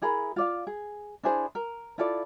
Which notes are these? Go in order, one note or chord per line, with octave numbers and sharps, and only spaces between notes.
E4 G#4 A#4 B5
F4 D5 F5
G#4
D4 E4 G#4 C5
A#4
E4 F4 A4 D5